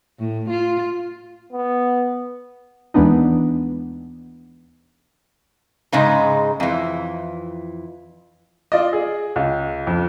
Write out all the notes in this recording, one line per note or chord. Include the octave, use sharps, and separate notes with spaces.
A2
F4
B3
D#2 E3 G#3 B3 D4 D#4
G#2 C#3 G#3 D#4
F2 E3
F4 D5 D#5
G#4
C#2
F2